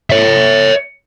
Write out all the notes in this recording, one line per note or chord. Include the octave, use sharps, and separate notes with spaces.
C#5 E5